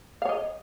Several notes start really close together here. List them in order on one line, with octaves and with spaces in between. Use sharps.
F5 C#5 D#5